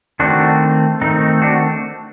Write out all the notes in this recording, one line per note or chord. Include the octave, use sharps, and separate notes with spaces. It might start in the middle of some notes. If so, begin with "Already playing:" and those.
D#3 A3 C4 D4 F#4
D#3 A3 C4 D#4
D4 F#4